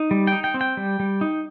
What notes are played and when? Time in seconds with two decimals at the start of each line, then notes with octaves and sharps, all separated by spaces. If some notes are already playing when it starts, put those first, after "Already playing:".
Already playing: D#4
0.11 G3
0.27 D#4 G5
0.44 G5
0.54 C4
0.61 G5
0.77 G3
1.00 G3
1.21 D#4